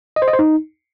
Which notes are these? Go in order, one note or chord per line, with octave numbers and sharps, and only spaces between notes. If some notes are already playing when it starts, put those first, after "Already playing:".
D#5
C5
D#5
C5
D#4